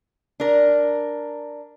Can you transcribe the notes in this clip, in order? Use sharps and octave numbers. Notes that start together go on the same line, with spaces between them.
D4 A#4